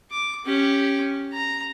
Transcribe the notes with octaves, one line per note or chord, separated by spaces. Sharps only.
D6
C#4 G4
A#5